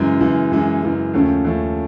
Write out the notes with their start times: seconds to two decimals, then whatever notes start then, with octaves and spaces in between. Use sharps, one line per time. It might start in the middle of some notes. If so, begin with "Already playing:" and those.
Already playing: F#2 C#3 E3 G#3
0.20 F#2 C#3 E3 G#3
0.52 F#2 C#3 E3 G#3
0.82 F#2 C#3 E3 G#3
1.14 D#2 C#3 F3 A3 C#4
1.45 D#2 C#3 F3 A3 C#4